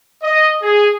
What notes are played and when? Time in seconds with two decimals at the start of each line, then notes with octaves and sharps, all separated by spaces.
0.23 D#5
0.63 G#4